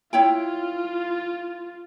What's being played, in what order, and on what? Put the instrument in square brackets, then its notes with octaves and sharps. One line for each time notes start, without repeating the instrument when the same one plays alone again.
[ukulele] E4 C#5 G5 [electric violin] F4